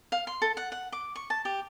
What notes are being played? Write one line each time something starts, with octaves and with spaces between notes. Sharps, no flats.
F5
C6
A4
F#5
F#5
D6
C#6
A5
G4